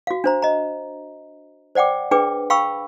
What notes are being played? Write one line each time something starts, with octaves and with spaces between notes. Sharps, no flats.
F#4 F5
D4 C5 A#5
D#5 A#5
C5 D5 F#5 G5 D6
D4 G#4 B4 G5 D6
F5 G5 B5 C#6 E6